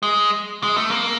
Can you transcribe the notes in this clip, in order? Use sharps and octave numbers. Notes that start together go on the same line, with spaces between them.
G#3
G#3
A3
A#3